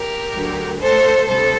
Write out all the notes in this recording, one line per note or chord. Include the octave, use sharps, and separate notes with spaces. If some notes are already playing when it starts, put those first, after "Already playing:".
Already playing: G4 A#4
D2 D3 F#3
A2 A3 A4 C5
D2 C3 G3 A4 C5